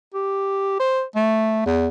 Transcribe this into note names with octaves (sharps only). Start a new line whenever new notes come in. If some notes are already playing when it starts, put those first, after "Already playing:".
G4
C5
A3
E2